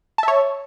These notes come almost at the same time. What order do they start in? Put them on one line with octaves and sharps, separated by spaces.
A5 E5 C#5